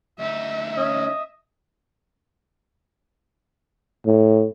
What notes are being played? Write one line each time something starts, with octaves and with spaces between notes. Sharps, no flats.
D2 D#4 E5
C#4 D#5
A2